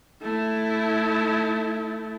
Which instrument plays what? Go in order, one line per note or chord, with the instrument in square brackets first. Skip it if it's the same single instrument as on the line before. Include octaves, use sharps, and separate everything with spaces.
[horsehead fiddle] A3 E4